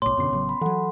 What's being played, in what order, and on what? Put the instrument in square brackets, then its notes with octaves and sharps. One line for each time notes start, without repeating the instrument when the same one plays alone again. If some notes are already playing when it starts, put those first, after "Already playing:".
[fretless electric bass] B1 A2 [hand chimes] C#5 D6 [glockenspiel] C6
[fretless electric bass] F#2 B2 D3 [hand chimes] B3 C#4 C7
[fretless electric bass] A1 C#3 F#3
[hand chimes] B5
[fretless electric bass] E3 F#3 [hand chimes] A4 F#5